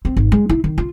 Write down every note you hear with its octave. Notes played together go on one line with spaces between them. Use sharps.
C4
G#1
G#3
E4
D#3
F4